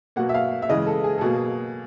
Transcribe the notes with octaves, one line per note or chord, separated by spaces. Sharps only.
B2 F#3 A#3 F#5
E5
F5
E5
C#3 E3 G#3 D#5
A4
G#4
A4
B2 F#3 A#3 G#4